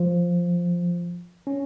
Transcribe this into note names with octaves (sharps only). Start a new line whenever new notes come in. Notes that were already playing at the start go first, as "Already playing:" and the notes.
Already playing: F3
C#4